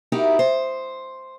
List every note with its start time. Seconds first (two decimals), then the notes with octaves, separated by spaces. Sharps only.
0.12 D#4 E4 F#4 G4 A#4
0.39 C5